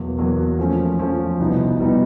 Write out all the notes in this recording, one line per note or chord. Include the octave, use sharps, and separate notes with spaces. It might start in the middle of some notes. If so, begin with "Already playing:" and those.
Already playing: E2 B2 F#3 A#3
E2 B2 F#3 A#3
F3 A3 C#4
F3 A3 C#4
C2 B2 G3 B3 D#4
B2 G3 B3 D#4